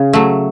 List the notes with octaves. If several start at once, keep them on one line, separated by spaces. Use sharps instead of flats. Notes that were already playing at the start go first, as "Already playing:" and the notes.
Already playing: C#3
F#3 A3